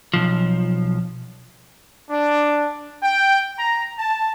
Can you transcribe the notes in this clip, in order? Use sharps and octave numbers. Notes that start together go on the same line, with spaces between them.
B1 F3
D4
G5
A#5
A5